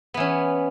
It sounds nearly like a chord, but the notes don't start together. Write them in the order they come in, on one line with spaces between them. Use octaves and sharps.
B3 E3 C#4